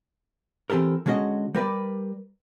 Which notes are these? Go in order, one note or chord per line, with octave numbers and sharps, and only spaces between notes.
E3 C4 G4 A4 A#4
D3 G#3 C#4 F#4 D#5
G3 A#4 B4 D5